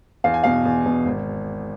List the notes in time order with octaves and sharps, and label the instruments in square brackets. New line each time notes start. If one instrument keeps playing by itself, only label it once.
[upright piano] E2 F5
G#5
B2 F5
E2
B2
G#1